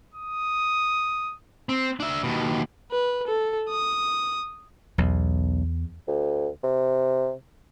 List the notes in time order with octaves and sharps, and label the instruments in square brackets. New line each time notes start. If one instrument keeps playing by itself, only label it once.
[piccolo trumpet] D#6
[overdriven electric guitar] C4
D4 E5
D#2 B2
[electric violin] B4
A4
D#6
[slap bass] B1 [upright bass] E2
[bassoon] D2
C3